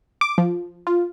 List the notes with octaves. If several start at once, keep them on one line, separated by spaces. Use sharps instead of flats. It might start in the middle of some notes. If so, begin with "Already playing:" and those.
D6
F3
F4